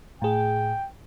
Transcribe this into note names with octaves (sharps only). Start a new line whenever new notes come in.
A2 G#4 G5